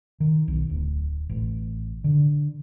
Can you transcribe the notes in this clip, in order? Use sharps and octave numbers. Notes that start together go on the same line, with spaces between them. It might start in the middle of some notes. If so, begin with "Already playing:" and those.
D#3
B1
D1
A1
D3